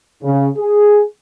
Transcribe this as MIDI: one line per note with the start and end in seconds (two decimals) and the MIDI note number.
0.23 0.48 49
0.57 1.03 68